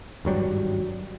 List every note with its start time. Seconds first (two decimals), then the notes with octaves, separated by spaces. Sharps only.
0.25 G#1 G2 F#3 G3